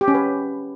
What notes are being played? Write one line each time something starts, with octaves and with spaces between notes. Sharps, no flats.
G4
C#4
B4